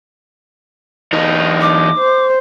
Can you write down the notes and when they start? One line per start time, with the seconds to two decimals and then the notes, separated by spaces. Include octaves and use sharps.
1.13 E2 D#4
1.61 D6
1.98 C5